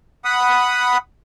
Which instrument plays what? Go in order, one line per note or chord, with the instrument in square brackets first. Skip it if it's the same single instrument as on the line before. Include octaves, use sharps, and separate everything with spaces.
[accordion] F#5 B5 D#6